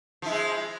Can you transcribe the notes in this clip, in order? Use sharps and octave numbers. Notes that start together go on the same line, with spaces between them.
F3 G#3 E4